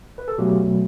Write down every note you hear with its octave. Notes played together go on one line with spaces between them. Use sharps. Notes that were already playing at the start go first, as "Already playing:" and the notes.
B4
A4
B2 F#3 A3 G4